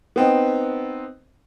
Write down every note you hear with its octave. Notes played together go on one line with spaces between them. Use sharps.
B3 C4 D#4